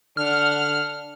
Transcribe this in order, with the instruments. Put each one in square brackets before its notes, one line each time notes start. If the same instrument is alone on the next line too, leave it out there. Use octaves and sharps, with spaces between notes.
[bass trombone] D3 [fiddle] D4 F#5 [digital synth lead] F6